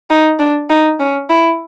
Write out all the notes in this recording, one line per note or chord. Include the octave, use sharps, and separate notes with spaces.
D#4
D4
D#4
C#4
E4